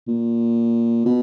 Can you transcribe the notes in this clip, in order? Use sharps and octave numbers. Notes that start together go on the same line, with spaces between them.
A#2
B2